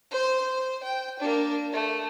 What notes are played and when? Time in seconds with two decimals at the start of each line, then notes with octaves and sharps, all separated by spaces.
0.11 C5 C6
0.41 C5
0.83 G5
1.19 A#3 D4
1.73 A3